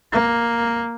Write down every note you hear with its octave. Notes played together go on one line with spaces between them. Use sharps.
A#3